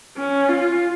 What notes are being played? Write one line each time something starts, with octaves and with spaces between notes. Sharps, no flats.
C#4
F4